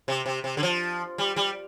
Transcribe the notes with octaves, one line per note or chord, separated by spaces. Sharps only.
C3
C3
C3
D3
F3
G3
G3